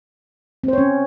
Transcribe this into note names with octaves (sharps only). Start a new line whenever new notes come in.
C4 C#4 C5 C#5